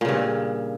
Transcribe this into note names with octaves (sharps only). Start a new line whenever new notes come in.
G2 A#2 C#3